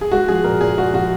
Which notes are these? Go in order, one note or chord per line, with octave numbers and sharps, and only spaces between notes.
G#4
G#3 F#4
F3 G#4
A#2 A#4
A#2 G#4
G#3 F#4
F3 F#4